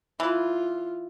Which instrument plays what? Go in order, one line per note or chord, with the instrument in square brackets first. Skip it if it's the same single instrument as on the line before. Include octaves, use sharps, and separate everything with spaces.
[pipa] E3 [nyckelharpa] F4